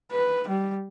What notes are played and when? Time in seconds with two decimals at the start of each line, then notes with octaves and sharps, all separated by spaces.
0.12 B4
0.48 G3